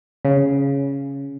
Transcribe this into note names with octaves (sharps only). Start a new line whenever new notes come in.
C#3